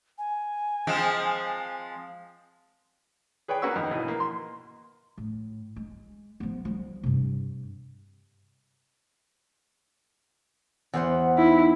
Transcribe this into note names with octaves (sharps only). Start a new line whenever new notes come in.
G#5
F3 G#3 C4
G#4 B4 C#5 D5 G5
A#3 C#4 F#4 B4 C#6 E6
F2 D#3
A#1 B2 E3 B4
A#3
C6
A2
G#3
F3 B3
F3 G3
G2 C3
E2 C5 F#5
D#4 E4